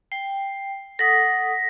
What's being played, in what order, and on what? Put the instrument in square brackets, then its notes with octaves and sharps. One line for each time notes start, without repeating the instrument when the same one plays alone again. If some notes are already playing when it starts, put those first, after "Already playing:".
[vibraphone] G5 [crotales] C7
[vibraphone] A4 F#5 D#6 [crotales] A#6 B6